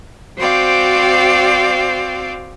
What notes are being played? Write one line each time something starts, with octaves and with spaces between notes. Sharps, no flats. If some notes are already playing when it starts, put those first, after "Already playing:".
C4 F#4 C5 D5 F5 G5